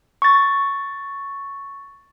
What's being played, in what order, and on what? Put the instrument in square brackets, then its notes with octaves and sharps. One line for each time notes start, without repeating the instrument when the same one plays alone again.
[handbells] C#6 A6